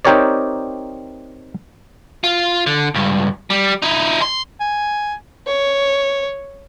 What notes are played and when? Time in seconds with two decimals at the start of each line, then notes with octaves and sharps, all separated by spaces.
0.05 C4 D#4 G4 A#4 C#5 D5
2.24 F4
2.66 D3
2.94 C#2 G2
3.50 G3
3.82 D#4 E4
4.22 C6
4.61 G#5
5.47 C#5